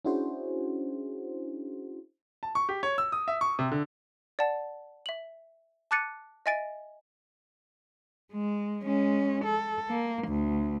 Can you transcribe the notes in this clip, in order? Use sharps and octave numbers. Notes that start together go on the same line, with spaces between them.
C#4 D4 E4 F#4 G#4 C5
A5
C#6
G4
C#5
E6
D#6
E5
C#6
C3
D3
D5 F#5 A5
E5 F#7
A5 D6 F#6 A6 C#7 D#7
D#5 E5 G#5 A6 D7
G#3
G#3 C#4
A4
A#3
D2